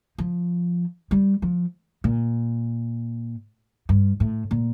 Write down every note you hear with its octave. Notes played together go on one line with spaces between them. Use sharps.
F3
G3
F3
A#2
G2
A2
A#2